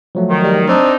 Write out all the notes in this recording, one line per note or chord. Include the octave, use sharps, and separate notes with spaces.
F3 F#3 A3
D#3
G3
C4 D4 D#4